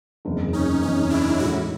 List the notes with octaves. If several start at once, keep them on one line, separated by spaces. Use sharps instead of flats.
F#1 E2 C3
C#4 D#4
F#1 E2 C3 C#4 D#4
D4 E4
A2 E3 G#3 E4 F#4